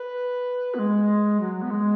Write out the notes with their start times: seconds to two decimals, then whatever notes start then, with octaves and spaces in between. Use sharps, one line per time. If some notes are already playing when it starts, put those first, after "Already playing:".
Already playing: B4
0.74 B3
0.78 G#3
1.40 F#3
1.61 B3
1.70 G#3